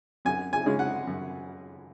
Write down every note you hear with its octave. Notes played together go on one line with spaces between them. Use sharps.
F#2 G#5
G#5
C#3 G#3 C#4
F#5
F#2